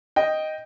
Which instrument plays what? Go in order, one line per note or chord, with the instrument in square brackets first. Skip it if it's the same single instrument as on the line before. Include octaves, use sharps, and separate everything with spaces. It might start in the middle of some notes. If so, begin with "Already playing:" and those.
[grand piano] D#5 G5